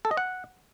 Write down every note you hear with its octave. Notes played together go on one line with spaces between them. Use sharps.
A4
D#5
F#5